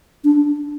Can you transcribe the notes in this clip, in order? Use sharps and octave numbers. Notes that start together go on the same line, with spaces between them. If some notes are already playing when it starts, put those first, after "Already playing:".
D4